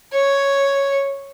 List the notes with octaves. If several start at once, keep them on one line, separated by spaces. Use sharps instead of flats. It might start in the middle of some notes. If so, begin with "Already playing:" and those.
C#5